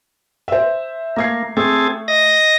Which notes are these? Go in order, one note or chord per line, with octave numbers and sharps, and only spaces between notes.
C5 E5
A3 A#3 G#6 C7
A3 C4 G#4 A4
D#5 A#6